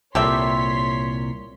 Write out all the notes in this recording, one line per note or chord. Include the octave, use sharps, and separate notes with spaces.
C2 A#2 G4 A4 C#5 E5 C6 B6